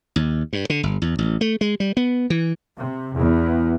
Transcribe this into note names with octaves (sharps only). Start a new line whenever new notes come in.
D#2
G2
D3
G1
E2
A1
A3
G#3
G3
B3
E3
C3
E2